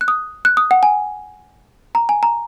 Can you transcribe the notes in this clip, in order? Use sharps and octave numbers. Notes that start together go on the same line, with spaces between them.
F#6
D#6
F#6
D#6
F#5
G#5
A#5
G#5
A#5